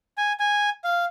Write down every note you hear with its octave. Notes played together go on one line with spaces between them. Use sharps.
G#5
G#5
F5